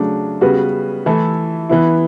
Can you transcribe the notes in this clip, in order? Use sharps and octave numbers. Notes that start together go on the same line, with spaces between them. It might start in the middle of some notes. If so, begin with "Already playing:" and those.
Already playing: C#3 F#3 A3 D4
C#3 G3 B3 F#4 B4
E3 A3 E4 A4 E5
E3 B3 E4